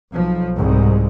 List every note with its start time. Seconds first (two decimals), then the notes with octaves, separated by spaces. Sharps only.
0.14 B1 F3
0.57 C2 G#2